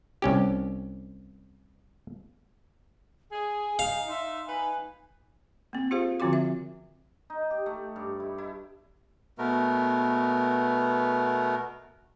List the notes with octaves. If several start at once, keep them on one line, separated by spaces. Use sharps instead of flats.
C2 C#4 G4
G#4 G#5
D#4 F5
D#4 E5 C6
D#4 B4 G#5
A#3 C4
F4 G4 G#4 C5 F5
D3 F3 C4 F4 F#4 D6
E5
D#4
G4
A3
G2
E4
E4
B2 A3 B3 A#4